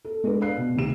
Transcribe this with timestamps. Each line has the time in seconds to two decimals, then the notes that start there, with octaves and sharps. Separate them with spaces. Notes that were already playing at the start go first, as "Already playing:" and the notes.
0.05 A4
0.24 G#3 D4 A4 B4
0.41 D5 F5 F#6 C7
0.57 B2
0.74 D2 C3 D#3 G4 E7